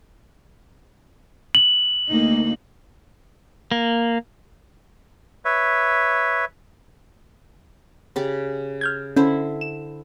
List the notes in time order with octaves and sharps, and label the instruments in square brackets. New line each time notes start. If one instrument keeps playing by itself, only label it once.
[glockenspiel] F#7
[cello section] D2 A#3 D#4
[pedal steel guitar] A#3
[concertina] B4 C#5 E5
[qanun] C#3 G4 D5
[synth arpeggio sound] F6 G6 G#6
[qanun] D3 E4 C5 [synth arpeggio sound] C#4
[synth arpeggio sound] E7